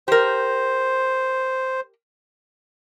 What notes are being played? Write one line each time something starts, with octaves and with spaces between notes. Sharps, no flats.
G4 A#4 C5